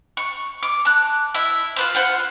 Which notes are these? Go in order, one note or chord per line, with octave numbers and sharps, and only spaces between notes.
C#6
D6
A5 F#6
E4 E5
F4 B4 C5
F4 C5 F#5